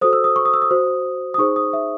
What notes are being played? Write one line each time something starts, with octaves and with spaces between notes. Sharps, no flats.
F#4 A4 C5 D#6
E6
D#6
C#6
D#6
E6
D#6
F#4 C5
D#6
D#4 G#4 C5 C#6
D#6
E5